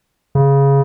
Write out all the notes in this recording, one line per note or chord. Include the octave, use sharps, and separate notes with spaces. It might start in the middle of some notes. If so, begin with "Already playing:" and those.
C#3